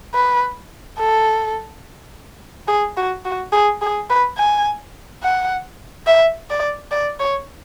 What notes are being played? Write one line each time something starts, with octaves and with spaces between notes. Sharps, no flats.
B4
A4
G#4
F#4
F#4
G#4
G#4
B4
G#5
F#5
E5
D5
D5
C#5